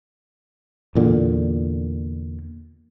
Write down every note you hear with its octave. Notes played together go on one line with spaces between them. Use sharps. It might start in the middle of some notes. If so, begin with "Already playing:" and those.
E2 A#2 D3